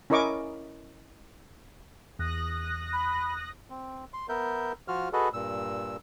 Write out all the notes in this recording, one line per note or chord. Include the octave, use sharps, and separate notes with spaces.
C#4 E4 A#4 D#5 C#6 D6
E2 D#6 F#6 A#6
B5
C4
C6
B3 A#4 E5 G6
F3 F4 F#4 F6
F#4 G#4 A4 B4 D#5
G2 A#2 E6